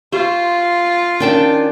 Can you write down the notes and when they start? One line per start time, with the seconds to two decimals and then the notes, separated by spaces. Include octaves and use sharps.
0.12 F4 G4 C5
1.20 D#3 C#4 D4 G5 A5